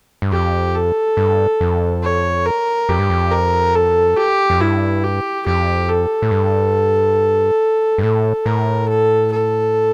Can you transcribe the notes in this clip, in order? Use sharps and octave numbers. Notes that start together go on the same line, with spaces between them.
G2
F2 G4
A4
G2
F2
C#5
A#4
F2 G4
G2
F2
A#4
A4
G4
F2
G2 E4
G4
F2 G4
A4
A2
G2
G2
A2 A4
A2 A#4
A4
A4